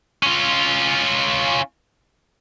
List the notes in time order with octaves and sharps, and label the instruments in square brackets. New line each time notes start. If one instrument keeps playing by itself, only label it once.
[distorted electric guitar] C#4 F4